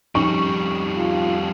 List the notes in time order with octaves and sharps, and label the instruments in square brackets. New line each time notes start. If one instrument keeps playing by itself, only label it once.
[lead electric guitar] F2 G3 [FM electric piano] F3 C#4 D#4 [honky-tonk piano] C#6
[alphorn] F4